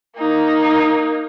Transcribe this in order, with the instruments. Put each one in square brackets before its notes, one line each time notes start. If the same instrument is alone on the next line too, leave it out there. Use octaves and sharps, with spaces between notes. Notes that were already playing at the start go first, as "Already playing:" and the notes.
[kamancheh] A#3 D#4